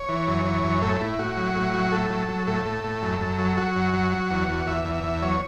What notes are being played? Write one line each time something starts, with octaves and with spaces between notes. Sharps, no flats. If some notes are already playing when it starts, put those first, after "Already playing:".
Already playing: C#5
E3
F#2
E3
F#2
A2 A4
A2 E4
A2 F#4
F#3
A2
F#3
A2 A4
F#3
F#3
A2 A4
A2
A2
F#2
F#2
F#3
F#3 F#4
F#2
F#3
F#3
E2
E2
E2 E5
E2
E5
E2
F#3 C#5